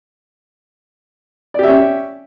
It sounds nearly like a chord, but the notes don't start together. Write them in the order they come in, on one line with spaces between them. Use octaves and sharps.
D5 G4 E5 C#4